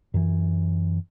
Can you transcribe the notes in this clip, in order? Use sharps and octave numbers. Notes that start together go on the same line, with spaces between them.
F#2 E3